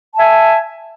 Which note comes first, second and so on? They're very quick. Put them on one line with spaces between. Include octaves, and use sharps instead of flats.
A5 E5 G#5